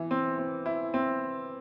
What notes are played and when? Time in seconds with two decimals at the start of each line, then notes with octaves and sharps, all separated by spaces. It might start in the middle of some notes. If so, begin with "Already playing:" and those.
Already playing: E3
0.11 C4
0.38 C4
0.66 E4
0.94 C4